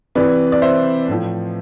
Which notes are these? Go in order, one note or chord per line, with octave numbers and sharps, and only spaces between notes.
C3 E3 B4 D5
D5
C5 E5
A2 F3